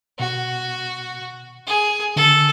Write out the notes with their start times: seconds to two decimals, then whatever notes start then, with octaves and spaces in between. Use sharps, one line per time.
0.19 B2 F#4
1.67 G#4
2.16 D3 A4